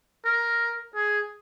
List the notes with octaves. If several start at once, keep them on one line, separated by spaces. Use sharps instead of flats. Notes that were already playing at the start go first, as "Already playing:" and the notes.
A#4
G#4